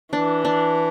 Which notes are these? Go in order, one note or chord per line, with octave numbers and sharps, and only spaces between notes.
E3 D4
D4